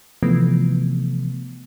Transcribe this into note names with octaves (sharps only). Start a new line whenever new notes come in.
C3 E3 F3 A3 B3